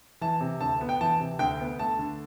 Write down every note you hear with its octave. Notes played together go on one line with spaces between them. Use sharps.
E3 A5
C3
D2 A5
B3
G5
E3 A5
C3
D2 G5
B3
A3 A5
D3